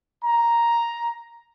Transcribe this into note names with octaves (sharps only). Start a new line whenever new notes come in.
A#5